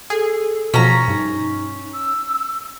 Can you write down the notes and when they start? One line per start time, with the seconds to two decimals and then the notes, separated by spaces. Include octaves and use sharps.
0.10 G#4 A4
0.74 B2 F3 C#4 A#5
1.08 G2 D#4
1.94 E6